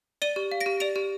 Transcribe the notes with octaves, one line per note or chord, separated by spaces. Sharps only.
D5 D#7 G7
G4
F5
A#6 D7
G4
D5 D7 F7
G4